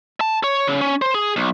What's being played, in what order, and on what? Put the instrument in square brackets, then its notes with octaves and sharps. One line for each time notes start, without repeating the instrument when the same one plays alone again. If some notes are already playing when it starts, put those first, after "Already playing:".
[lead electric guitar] A5
C#5
C#3
C#4
C5
G#4
B1